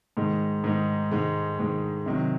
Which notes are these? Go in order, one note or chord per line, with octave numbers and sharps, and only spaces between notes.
G#2 D#3 G#3
G#2 D#3 G#3
G#2 D#3 G#3
G#2 D#3 G#3
C3 D#3 F#3